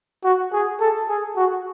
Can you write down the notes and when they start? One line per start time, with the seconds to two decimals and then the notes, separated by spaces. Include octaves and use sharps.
0.24 F#4
0.53 G#4
0.81 A4
1.09 G#4
1.36 F#4